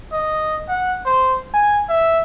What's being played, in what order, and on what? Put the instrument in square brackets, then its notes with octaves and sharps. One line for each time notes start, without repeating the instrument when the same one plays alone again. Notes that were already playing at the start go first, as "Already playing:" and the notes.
[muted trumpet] D#5
F#5
C5
G#5
E5